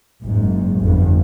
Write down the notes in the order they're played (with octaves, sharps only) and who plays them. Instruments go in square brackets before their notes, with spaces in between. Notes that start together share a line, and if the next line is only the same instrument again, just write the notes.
[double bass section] F#1 G#2
G1 F2